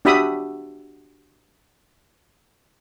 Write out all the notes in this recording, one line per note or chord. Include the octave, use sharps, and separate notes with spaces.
D4 F#4 G4 E5 B5 D#6